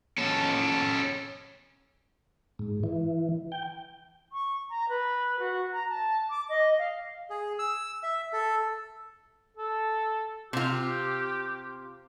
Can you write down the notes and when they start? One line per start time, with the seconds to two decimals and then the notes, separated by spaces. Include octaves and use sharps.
0.18 C#4 A4
2.59 G#2
2.83 E3
3.52 G5
4.32 C#6
4.70 A#5
4.88 B4
5.39 F#4
5.72 A#5
5.89 A5
6.29 D6
6.49 D#5
6.78 F5
7.30 G#4
7.59 E6
8.03 E5
8.33 A4
9.57 A4
10.53 C3 F4 G4